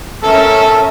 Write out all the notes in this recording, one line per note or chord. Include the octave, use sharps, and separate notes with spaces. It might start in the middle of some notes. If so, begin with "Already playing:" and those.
C#4 A4 A#4 E5